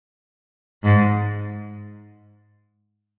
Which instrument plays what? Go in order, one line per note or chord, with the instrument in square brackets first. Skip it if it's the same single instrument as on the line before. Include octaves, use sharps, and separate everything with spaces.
[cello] G#2